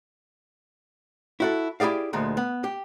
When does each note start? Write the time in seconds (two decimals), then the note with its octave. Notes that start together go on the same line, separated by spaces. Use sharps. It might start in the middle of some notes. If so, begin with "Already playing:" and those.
1.40 E4 F#4 A4
1.80 E4 G4 G#4 D5 F5
2.13 D2 A#2 F3 G#3
2.37 B3
2.64 G4